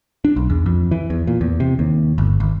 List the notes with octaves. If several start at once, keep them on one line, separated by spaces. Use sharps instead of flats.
D4
B1
E2
F2
E3
E2
A#2
E2
C3
D#2
G1
G#1